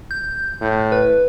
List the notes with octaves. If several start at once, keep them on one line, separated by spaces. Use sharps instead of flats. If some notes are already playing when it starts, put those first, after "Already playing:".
G6
A2
B4